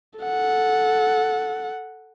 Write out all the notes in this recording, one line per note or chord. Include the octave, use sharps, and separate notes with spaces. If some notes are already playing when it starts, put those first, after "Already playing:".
A4 F#5